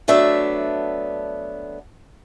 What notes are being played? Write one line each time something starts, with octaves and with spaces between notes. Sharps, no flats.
F#3 A3 B3 D4 E5